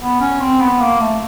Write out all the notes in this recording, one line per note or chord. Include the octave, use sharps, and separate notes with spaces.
B3
C#4
C4
B3
A#3
A3